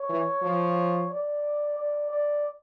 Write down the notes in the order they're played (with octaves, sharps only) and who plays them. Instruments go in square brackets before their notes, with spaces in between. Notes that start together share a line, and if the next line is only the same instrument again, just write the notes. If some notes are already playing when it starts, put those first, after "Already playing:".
Already playing: [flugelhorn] C#5
[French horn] E3
F3
[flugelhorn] D5
D5
D5